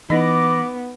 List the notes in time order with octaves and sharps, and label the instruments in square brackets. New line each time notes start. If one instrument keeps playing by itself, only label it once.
[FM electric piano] E3 A#6 [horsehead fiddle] B3 [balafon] D#4 D#5 [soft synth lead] D6